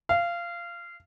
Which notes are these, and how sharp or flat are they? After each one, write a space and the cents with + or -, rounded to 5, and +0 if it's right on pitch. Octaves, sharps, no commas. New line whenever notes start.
F5 -20